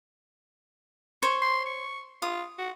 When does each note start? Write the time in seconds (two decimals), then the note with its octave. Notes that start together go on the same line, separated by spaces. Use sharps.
1.23 C5 C#5 C#6
1.42 C6
1.66 C#6
2.22 F4 D#6
2.59 F#4